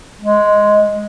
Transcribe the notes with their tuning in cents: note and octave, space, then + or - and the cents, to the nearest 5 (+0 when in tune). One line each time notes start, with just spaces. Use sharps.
G#3 +5